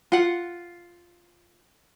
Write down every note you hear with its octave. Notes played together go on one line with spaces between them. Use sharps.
F4 F#5